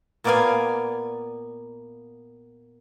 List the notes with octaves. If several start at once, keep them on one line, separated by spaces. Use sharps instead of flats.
A#2 A#3 B3 D5 F5 G#5